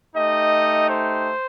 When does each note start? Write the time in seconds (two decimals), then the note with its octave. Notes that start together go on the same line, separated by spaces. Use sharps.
0.15 A3 D#4 G4 D#5
0.88 C5